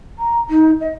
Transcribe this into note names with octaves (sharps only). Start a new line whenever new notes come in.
A#5
D#4
D#5